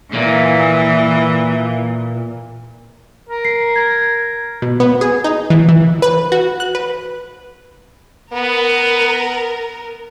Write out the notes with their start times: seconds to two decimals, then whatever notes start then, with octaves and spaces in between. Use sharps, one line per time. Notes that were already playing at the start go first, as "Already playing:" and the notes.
0.13 A#2 E3
3.29 A#4
3.45 C7
3.76 A#4 G#6
4.62 B2
4.80 B3
5.01 G#4
5.24 D#4
5.50 E3
5.69 E3
6.02 B4
6.32 F#4
6.60 F#6
6.75 B4
8.33 B3 A#4